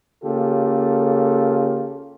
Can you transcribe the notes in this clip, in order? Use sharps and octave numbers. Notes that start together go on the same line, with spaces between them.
C#3 A#3 F4 G4 A4